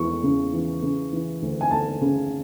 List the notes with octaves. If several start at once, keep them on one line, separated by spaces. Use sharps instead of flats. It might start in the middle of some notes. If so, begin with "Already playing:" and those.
Already playing: E2 E3 G#3 C#6
C#3
E3
C#3
E3
D2
G#5
D2 A5
C#3